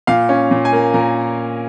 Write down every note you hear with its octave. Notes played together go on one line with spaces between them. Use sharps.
A#2 F5
C#4
A#2
G#5
A#3
A#2 A#4